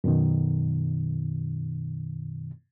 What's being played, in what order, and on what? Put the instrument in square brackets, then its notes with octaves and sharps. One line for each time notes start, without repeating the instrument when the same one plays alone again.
[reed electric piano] F#2 B2 D#3